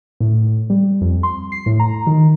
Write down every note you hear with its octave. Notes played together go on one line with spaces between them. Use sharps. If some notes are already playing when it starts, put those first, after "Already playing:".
A2
G3
F2
C6
C7
A2
A#5
D#3